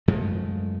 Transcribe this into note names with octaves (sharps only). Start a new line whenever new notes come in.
F#2 F3 G#3 A3